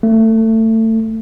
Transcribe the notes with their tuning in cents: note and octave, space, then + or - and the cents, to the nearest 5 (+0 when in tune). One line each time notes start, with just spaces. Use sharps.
A3 +25